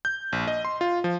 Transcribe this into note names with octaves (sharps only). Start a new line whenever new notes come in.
G6
A#1
D#5
C6
F4
F3